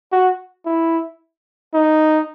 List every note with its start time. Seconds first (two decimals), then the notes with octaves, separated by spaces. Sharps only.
0.12 F#4
0.66 E4
1.74 D#4